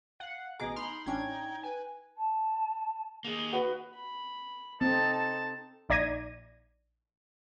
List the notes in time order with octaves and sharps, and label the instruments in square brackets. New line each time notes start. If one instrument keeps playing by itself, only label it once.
[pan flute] F5 [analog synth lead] F#5
[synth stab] A1 B2 D6 [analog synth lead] G#4 [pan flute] D#5 [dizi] A#5
[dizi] D#4 [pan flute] B5 [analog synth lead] C6 [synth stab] F6
[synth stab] A1 C#4 D4 [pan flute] G5 [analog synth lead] G#6
[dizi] B4 [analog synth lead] G#5
[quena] A5
[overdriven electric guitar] A#3 D#4 [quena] G#4
[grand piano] F#4 B4
[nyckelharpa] B5
[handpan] C4 [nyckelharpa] D#4 A4 [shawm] A5
[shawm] A5
[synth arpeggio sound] A#1 D#4 D5 G#6 A#6 D#7